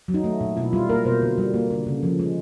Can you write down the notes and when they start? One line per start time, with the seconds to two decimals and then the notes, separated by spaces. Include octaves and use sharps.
0.08 F#3
0.14 D#4
0.24 A3
0.41 A#2
0.57 B2 E4
0.73 G3 F4
0.90 A#3 A#4
1.05 B2 C5
1.22 D3
1.38 G3
1.54 A#3
1.71 D3
1.86 C#3
2.03 F3
2.20 G#3